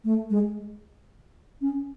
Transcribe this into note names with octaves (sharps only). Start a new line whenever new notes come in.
A3
G#3
C#4